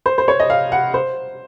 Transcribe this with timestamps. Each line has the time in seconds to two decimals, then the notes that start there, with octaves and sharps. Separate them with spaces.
0.06 C5
0.18 C5
0.28 C#5
0.40 D#5
0.50 F5
0.72 F#5
0.94 C5